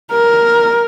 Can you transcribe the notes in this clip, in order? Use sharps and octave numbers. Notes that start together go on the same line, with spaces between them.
A#4